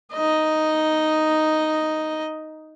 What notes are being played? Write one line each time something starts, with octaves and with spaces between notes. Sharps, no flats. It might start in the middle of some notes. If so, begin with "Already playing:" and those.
D#4 D#5